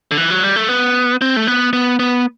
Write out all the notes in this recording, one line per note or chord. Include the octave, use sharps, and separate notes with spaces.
D3
E3
F#3
G3
A3
B3
C4
A3
B3
B3
B3